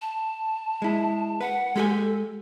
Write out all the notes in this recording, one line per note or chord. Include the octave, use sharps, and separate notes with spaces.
A5
G#3 E4
B4 F#5
G#3 G4 A4 G#5